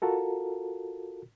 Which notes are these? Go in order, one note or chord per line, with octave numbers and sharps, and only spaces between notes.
F4 F#4 A4 A#4